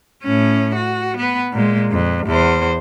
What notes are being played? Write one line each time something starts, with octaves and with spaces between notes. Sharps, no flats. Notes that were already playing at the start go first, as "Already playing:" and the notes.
A2 C#4
F#4
B3 B4
A#2 G#3
F2
E2 C5